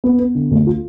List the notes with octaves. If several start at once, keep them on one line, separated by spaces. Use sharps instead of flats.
B3
B3
D3
D2
F4